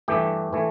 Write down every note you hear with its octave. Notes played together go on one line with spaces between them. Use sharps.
G2 E3 A3 G4
E3 A3